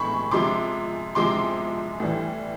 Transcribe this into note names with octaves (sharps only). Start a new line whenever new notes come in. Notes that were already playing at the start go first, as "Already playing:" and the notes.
Already playing: A2 E3 G#3 B5 C#6
C3 F3 G#3 C6 D6
C3 F3 G#3 C6 D6
A2 E3 G3